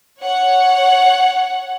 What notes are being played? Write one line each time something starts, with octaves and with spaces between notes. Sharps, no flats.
C#5 F#5